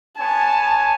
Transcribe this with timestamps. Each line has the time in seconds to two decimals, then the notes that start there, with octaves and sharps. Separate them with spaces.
0.18 B3 C#5 G#5 A5